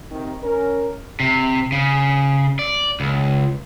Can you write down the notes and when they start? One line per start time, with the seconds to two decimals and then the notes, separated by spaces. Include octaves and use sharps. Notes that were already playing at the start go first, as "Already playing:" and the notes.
0.10 C3 D#3
0.44 C#4 A#4
1.20 C3
1.72 C#3
2.59 D5
3.00 C#2